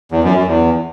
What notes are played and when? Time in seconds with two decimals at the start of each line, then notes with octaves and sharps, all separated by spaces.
0.12 E2
0.23 F#2
0.35 F#2
0.47 E2